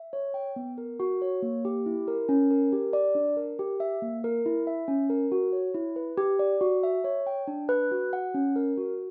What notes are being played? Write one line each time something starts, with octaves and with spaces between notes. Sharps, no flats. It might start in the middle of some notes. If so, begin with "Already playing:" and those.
Already playing: E5
C#5
G5
B3
A#4
F#4
C#5
A#3
G4
E4
A#4
C#4
A#4
G4
D5
D4
A#4
G4
E5
A#3
A#4
E4
E5
C#4
A#4
F#4
C#5
E4
B4
G4
D5
F#4
E5
C#5
G5
D4
B4
F#4
F#5
C#4
A#4
F#4